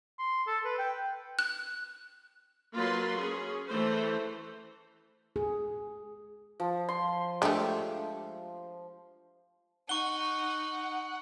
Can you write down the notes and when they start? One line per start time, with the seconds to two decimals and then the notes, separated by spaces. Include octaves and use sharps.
0.19 C6
0.47 A4
0.65 B4
0.79 G5
1.39 F#6
2.75 F#3 A#3 F4 B4 C6
3.16 C#4 G#4
3.68 E3 A3 C5
5.36 G#4
6.60 F3
6.89 C6
7.42 G#3 A3 D4 G4
9.89 D#4 F#5 C#6 G7